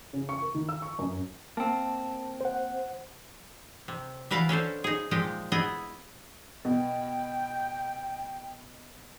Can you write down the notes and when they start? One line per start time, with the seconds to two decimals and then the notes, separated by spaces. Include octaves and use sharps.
0.13 C#3
0.29 C#6
0.42 A#4
0.54 D#3
0.69 E6
0.82 C#6
0.99 F#2
1.57 A#3 C4 A5
2.41 C5 F#5
3.88 C3
4.31 E3 A#4 B4 F5 F#5 A5
4.49 C#4 D4 A4 C5
4.84 D#4 G#4
5.11 A#2 F3 G#3 G4 D#5 G5
5.52 B3 E4 G#4 D#5
6.65 B2 G5